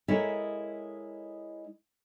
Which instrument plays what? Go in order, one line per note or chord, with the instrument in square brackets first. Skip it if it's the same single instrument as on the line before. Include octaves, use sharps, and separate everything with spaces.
[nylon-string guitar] G#3 E4 A4 A#4 C#5 E5